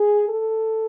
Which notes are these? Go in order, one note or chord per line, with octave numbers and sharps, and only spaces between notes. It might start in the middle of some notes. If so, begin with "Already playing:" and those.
Already playing: G#4
A4